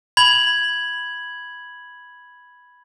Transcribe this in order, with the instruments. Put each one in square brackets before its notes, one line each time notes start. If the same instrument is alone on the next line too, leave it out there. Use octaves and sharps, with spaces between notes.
[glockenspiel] B5 G#6 F#7